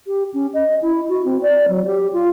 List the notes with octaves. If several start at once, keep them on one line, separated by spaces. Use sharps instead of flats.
G4
C#4
D#5
E4
F#4
C4
D5
F#3
G4
F4